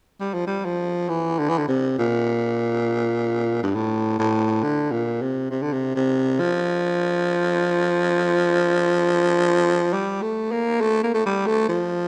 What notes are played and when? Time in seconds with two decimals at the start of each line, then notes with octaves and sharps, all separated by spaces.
0.21 G3
0.34 F3
0.47 G3
0.65 F3
1.09 E3
1.39 D3
1.49 E3
1.58 D3
1.68 C3
1.98 A#2
3.63 G2
3.75 A2
4.19 A2
4.63 D3
4.92 A#2
5.22 C3
5.51 C3
5.62 D3
5.73 C3
5.95 C3
6.40 F3
9.93 G3
10.22 A3
10.51 A#3
10.81 A3
11.03 A#3
11.14 A3
11.26 G3
11.47 A3
11.69 F3